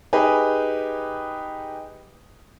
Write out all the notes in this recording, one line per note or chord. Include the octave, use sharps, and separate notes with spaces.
D#4 G4 G#4 B4